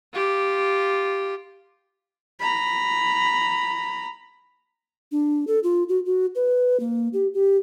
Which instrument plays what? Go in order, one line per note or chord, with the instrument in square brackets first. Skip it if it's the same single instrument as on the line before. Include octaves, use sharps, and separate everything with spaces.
[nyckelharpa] F4 G4
[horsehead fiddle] A#5 B5
[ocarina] D4
A4
F4
F#4
F#4
B4
A#3
G4
G4